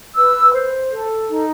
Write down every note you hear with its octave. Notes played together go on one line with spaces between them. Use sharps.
B4 E6
C5
A4
D#4